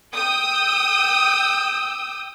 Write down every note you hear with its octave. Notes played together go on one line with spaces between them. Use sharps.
G5 D#6 E6 G6